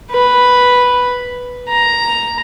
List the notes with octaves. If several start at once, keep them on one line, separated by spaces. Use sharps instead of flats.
B4
A#5